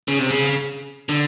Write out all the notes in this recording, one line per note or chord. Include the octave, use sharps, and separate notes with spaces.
C#3
C3
C#3
D3